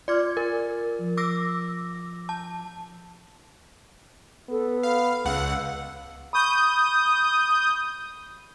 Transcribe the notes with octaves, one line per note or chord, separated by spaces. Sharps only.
F4 D5 D6 F6 G#6
A#4
F3
D6 E6 A#6
A5
B3 A4
F5 B5
C#2 F5 F#5 E6
B5 C#6 D#6 G6